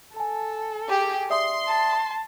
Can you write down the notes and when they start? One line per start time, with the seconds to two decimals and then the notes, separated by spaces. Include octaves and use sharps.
0.16 A4 G#5 A5
0.88 G4 G#4
1.30 D5 E5 C6 D#6
1.68 A5